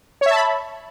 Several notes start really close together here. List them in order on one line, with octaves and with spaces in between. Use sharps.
C#5 E5 A5 B5